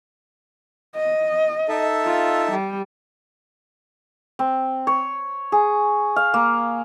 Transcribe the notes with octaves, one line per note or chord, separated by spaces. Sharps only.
D#5
D#4 A4 E5
F4
G3
C4
C#5
G#4
F5
A#3